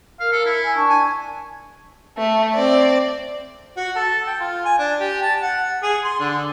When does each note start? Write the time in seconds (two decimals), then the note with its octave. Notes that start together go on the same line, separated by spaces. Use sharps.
0.20 A#4 F5
0.32 A4
0.46 E4
0.63 G#5
0.75 D4 A5 C#6
0.89 G#5
2.18 A3
2.55 C4 D5
3.77 F#4
3.96 A4
4.27 G5
4.40 F4
4.65 G#5
4.79 D4
5.00 G4
5.22 A5
5.42 F#5
5.83 G#4
6.05 C6
6.20 D3